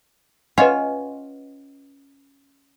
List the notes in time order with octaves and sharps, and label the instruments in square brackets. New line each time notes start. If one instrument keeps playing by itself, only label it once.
[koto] C#4 F4 C#5 [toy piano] B4 D#5 F#5